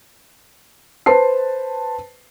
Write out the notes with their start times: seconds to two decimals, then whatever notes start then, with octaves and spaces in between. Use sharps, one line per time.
1.06 B4 C5 A5 C7